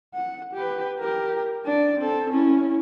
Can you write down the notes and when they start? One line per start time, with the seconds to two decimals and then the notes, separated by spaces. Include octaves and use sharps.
0.14 F#5
0.54 G4 B4
1.00 G4 A#4
1.65 D4 D5
1.99 C4 A4
2.32 C#4 E4